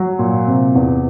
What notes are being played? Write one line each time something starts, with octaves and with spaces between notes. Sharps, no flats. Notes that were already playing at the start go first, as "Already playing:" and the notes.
Already playing: F#3
A#2
C3
E2